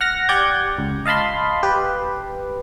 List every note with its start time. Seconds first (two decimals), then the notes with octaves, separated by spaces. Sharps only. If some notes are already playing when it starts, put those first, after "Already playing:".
0.01 F#5 F6 A#6
0.29 G4 D5 F#5 G6 G#6
0.78 C#2
1.05 D#5 F5 A5 B5 C6
1.63 G4 B4